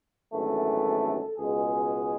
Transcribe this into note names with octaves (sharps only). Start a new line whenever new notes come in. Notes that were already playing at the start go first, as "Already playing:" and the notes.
G#1 F#2 E3 A3 A4
C#2 B2 G#3 G#4